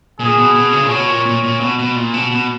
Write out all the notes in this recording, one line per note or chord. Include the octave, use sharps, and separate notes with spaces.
A#2 G#4
B2
B2
C#3
A#2
B2 C#5
A#2
A#2
A#2
B2
B2
A#2
B2
B2